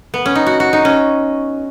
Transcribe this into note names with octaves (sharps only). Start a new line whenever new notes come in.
B3
C#4
D#4
F#4
F#4
D#4
C#4